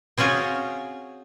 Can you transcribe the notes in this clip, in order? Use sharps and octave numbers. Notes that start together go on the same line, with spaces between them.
C4 C#4 F4 F#4 G#4